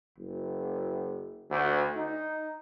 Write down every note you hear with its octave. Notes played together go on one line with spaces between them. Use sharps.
F#1
D2
D#4